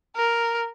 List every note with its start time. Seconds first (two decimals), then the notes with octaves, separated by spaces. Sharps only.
0.16 A#4